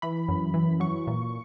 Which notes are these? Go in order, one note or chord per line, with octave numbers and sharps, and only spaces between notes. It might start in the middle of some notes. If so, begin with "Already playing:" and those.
E3 B5
F#2
E3
F#3 C#6
A#2